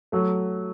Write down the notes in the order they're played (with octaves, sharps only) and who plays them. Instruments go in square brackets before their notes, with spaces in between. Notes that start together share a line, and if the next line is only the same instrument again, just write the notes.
[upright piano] F#3 A3